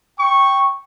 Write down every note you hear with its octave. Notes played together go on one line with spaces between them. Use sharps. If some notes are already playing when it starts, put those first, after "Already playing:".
G5 C#6